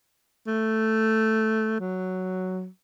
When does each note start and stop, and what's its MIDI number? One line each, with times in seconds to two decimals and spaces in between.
0.47 1.79 57
1.80 2.67 54